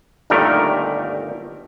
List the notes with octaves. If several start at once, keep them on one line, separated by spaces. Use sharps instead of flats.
G1 A#2 D#3 G3 A3 A#4